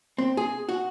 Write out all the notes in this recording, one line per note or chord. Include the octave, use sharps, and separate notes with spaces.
C4
G#4
F#4